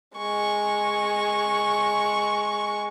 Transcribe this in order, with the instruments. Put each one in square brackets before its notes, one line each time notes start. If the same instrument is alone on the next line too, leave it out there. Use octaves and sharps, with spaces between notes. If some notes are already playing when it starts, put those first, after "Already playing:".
[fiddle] G#3 C#6